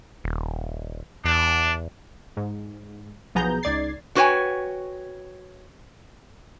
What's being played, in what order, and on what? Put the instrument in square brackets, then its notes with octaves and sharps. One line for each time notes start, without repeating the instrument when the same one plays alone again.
[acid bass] D#1
[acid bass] E2 [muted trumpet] D4
[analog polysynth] G#2
B1 F3 B3 G#4 A#5 G6
C#2 D#4 D5 G#6 A6 C7
[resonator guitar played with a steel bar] D4 F#4 B4 C#5 G5 G#5